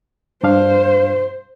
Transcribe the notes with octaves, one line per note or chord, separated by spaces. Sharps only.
G2 D4 C5 F5